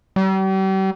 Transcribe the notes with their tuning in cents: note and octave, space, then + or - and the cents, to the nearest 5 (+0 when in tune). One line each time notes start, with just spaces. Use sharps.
G3 -40